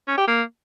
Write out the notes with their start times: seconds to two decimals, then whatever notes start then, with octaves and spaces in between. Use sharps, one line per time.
0.08 C#4
0.18 G4
0.28 A#3